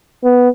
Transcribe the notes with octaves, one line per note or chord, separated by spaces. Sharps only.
B3